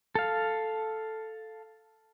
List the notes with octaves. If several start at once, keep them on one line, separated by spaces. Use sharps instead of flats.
A4 F5